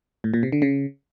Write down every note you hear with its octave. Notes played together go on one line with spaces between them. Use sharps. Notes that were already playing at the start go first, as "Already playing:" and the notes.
A2
A#2
C3
D3
C#3